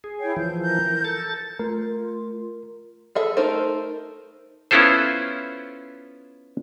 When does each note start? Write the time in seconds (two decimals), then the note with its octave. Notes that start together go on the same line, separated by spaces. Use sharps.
0.04 G#4
0.20 E4 C#5 G5
0.37 E3 F3 G6
0.60 A#4 G6
1.05 A4 A6
1.59 A3 F4 A#4
3.15 G#4 A4 E5
3.37 A3 D#4 A#4 C5
4.71 B3 C#4 E4 F4 A4 C5